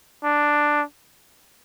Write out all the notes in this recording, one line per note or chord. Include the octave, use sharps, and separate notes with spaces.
D4